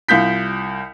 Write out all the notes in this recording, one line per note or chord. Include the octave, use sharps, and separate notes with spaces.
C2 F4 G6 B6